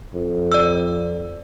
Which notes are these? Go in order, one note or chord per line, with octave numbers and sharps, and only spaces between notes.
F2
D5 E6